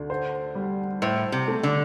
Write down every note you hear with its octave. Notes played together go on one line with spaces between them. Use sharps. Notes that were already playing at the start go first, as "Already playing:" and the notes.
Already playing: D2 D3
C5
G3
A2 C5
C3
A3
D3